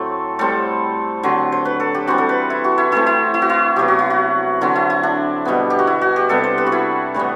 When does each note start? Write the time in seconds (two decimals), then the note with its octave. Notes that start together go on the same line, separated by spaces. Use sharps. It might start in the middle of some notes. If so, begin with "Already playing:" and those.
Already playing: A2 F#3 A3 C4 A4
0.39 A2 G3 C4 A4
1.23 D3 F#3 C4
1.52 C5
1.65 B4
1.80 A4
1.95 G4
2.07 E3 G3 C4 F#4
2.18 A4
2.29 B4
2.50 E4
2.64 F#4
2.78 E4
2.92 E3 A3 C4 E4
3.07 E4
3.34 E4
3.42 F#4
3.49 E4
3.76 C3 F#3 B3 G4
3.88 F#4
3.99 E4
4.10 F#4
4.61 D3 F#3 C4 E4
4.75 E4
4.90 E4
5.03 D4
5.45 B2 G3 B3
5.70 G4
5.79 F#4
5.87 E4
6.02 F#4
6.16 G4
6.29 C3 G3 B3 A4
6.44 C5
6.58 B4
6.66 F#4
6.72 E4
7.14 A2 E3 G3 B3